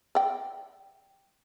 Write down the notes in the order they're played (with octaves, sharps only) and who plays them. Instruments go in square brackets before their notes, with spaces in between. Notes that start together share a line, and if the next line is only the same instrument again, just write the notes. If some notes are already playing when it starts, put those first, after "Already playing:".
[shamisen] D5 G5